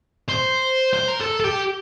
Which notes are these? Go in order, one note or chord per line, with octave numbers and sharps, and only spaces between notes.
C5
C5
A#4
A4
A4
G4